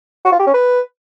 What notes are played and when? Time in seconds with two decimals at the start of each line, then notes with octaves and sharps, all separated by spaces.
0.25 F#4
0.32 F4
0.39 G4
0.47 C#4
0.54 B4